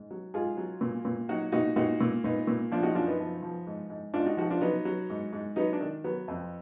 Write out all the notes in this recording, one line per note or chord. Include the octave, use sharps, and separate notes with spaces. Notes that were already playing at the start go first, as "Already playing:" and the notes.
Already playing: G#2
F#3
G#2 F4 G#4
F#3
A#2
A#2
F#3 D#4 F#4
A#2 D#4 F#4
A#2 D#4 F#4
A#2
A#2 B3 D#4
A#2
F3 D4 F4
D#4 F#4
F#2 D4 F4
B3 D#4
F3
F3
G#2
G#2
G#2 D4 F4
D#4 F#4
F3 D#4 F#4
D4 F4
F#3 B3 D#4
F#3
G#2
G#2
F#3 B3 D#4
D4
D#3
F#3 B3
F2